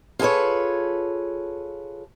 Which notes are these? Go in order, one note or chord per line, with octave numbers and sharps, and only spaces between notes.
F4 G#4 A4 B4 C#5